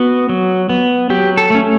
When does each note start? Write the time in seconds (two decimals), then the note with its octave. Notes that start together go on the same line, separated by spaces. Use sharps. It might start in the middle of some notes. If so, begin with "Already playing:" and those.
Already playing: B3 F#4
0.29 F#3
0.69 B3
1.10 F#3 G4
1.37 A4
1.50 A3 C#4